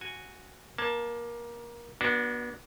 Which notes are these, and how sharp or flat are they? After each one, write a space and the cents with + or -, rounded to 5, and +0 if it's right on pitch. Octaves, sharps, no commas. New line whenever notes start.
F#4 +0 G#5 +0
A#3 +20 A5 +0
B3 -35 D4 +0 F#4 +0